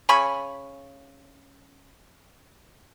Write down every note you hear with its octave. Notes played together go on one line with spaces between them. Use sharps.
C#3 G#5 B5 C#6